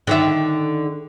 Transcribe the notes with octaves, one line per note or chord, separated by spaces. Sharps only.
D3 D#3 E5